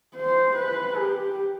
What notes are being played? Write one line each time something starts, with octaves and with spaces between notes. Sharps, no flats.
C5
B4
G4